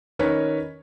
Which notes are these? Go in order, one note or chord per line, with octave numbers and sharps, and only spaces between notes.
D#3 C#4 A#4 B4 C#5